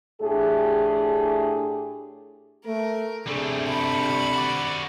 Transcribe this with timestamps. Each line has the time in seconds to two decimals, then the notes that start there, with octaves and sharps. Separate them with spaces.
0.21 A2 A3 D4 G4 G#4
2.65 A3 A#4
3.26 C3 G3 A3 D4 G#4 A4
3.69 B5 C#7
4.34 F#4 D5